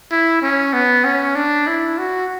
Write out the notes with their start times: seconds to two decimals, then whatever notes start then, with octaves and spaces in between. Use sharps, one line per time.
0.12 E4
0.42 C#4
0.73 B3
1.04 C#4
1.35 D4
1.67 E4
1.98 F#4